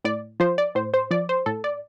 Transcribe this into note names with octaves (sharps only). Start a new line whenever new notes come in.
A2 D5
F3 C5
D5
A2 C5
C5
F3 D5
C5
A2 A4
D5